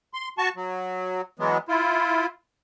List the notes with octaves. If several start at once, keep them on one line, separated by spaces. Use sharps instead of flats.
C6
F#4 A5 C#6
F#3
E3 F#3 G#3 B3
E4 F4